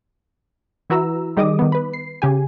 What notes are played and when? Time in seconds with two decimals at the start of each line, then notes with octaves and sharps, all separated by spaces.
0.90 E3 E4 F#4 B4 A#5 E6
1.37 D#3 G3 G#4 D#5 D6 D#6
1.59 D#3 B3
1.72 B4 B5
1.94 C7
2.22 C#3 G4 G#5